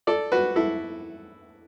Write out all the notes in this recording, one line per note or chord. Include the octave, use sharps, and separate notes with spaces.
A4 D5
F#4 B4
E4 A4